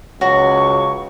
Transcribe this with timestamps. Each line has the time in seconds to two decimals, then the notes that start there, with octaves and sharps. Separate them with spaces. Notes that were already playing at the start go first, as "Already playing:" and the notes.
0.21 C#2 F#3 F#4 C#6